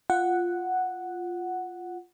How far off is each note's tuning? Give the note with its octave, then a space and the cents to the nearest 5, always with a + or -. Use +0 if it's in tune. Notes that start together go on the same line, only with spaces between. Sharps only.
F4 +0 F#5 +0